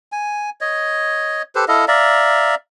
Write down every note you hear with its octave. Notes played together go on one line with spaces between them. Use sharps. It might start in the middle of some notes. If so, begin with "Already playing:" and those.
G#5
C#5 D#5
G4 A4 B4 C5
E4 A4 D#5 F5
D5 E5 F5 A#5